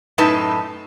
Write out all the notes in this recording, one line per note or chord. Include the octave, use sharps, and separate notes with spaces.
F#2 A2 D#4 B4 A5